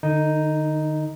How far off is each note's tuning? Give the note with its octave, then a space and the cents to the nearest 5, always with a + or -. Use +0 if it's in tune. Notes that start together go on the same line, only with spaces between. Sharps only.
D3 +40 D#4 +0